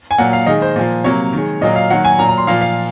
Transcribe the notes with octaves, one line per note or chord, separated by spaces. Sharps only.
G#5
A#2 F#3 A#3 F#5
F5
D#3 G#3 D#5
C5
A#2 F3 A#3
C3 F#3 A#3 C#5
D#3 G#3
A#2 F#3 A#3 D#5
F5
D#3 F#3 A#3 F#5
G#5
A#2 F#3 A#3 A#5
A#5
C6
A#2 F3 A#3 F5
F5